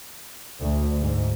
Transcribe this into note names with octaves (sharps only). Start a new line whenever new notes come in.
D2
G#2